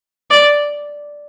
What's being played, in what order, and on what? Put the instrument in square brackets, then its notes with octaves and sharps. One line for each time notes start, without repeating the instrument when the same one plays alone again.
[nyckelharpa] D5